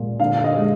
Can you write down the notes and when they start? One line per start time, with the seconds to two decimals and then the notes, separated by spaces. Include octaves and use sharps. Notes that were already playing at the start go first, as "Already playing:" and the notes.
Already playing: A#2 G#3
0.20 D3 F5
0.44 D#5
0.56 G#3